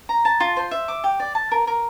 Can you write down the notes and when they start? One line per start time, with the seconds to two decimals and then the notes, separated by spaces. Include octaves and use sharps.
0.09 A#5
0.25 A5
0.40 F4
0.57 C5
0.71 E5
0.88 D6
1.04 G4
1.20 D5
1.35 A5
1.52 A#4
1.67 A#4